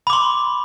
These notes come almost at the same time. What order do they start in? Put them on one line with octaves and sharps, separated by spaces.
B5 D6 C6